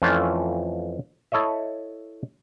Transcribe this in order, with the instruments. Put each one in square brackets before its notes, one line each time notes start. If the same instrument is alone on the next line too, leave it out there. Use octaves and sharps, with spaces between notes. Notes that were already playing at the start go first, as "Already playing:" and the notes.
[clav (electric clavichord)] F2 E3 A3 C#4 F4
E4 A4 C#5 D#5 E5